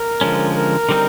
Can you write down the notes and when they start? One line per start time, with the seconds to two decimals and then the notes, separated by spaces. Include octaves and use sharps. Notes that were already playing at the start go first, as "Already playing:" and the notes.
Already playing: A#4
0.21 D3 F3 G#3 C#4
0.55 A#4
0.89 D3 G3 C4 D#4